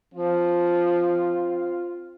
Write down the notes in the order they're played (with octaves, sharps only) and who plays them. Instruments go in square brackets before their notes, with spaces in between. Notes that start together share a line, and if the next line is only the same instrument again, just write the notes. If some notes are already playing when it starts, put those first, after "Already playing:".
[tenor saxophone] F3 [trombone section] C4 F4